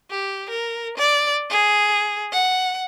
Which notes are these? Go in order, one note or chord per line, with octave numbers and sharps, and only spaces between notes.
G4
A#4
D5
G#4
F#5